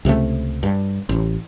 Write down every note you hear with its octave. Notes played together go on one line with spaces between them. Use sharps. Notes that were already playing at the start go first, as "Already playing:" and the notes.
C#2 C3 E3 A3
G2
A1